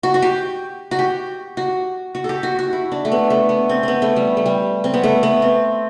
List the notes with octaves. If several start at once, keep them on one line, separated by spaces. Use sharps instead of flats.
F#4
F#4
G4
F#4
G4
F#4
F#4
G4 A4
F#4
F#4
E4
D4
A3
B3
A3
B3
C4
B3 C4
A3
G3
A3
G3
C4
B3
A3
B3
C4